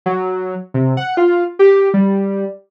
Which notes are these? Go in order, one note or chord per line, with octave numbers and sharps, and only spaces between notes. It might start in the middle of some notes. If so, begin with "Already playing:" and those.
F#3
C3
F#5
F4
G4
G3